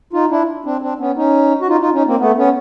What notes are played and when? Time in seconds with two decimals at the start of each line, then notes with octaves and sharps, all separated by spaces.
0.13 D#4 F4
0.30 D4 E4
0.65 C4 D4
0.82 C4 D4
0.99 B3 C#4
1.16 C#4 D#4
1.61 F#4
1.68 D#4 F4
1.81 D#4 F4
1.93 C#4 D#4
2.06 A#3 C4
2.19 A3 B3
2.37 B3 C#4